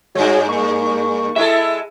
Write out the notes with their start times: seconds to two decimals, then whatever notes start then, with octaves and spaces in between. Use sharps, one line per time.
0.15 G2 G#3 F#4 C#5
0.49 A#3 C#6
1.36 G#3 E4 A4 E5